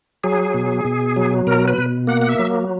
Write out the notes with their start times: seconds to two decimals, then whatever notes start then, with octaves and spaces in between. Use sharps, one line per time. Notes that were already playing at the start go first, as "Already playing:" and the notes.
0.24 F#3 G#4
0.54 B2
0.85 B2
1.16 F#3
1.47 B2 A#4
1.68 B4
1.78 B2
2.07 A#3 F#5
2.22 F#5
2.29 E5
2.39 F#3